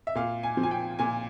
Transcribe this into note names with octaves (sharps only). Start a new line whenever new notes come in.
E5
A#2 F5
G#5
F3
G#5
G5
A#2 G#5